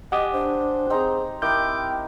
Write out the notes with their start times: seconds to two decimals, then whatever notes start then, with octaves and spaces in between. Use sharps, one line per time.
0.12 G4 D#5 F#5 G#5 D6 D#6
0.33 D4 C5
0.90 C4 D#4 G#4 A#5
1.42 D#4 E4 A#4 G5 D6 G6